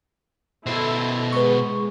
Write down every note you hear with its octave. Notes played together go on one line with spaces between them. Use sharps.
B2 E4 A4 C5
G#3 B4 C#6